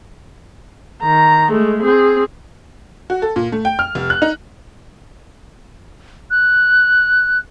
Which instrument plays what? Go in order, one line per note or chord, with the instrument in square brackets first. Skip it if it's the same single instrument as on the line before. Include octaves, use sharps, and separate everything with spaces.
[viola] D#3 A#5
G#3 A3
C4 G#4
[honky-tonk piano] F#4
A4
A#2
A3
G5
F6
F1
F#6
D#4
[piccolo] F#6